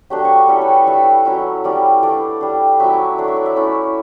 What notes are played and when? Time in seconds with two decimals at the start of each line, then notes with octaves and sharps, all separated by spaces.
0.10 F#3 A3 D4 G4
0.25 C#5
0.36 B4
0.48 G3 C#4 E4 A4
0.61 B4
0.68 C#5
0.87 G3 D4 E5
1.25 F#3 C#4 E4
1.64 G3 C#4 E4 D5
2.02 A3 D4 D5
2.41 G3 D4
2.80 F#3 C#4 E4 E5
3.18 A3 D4
3.28 E5
3.37 D5
3.46 E5
3.56 A3 C#4 E4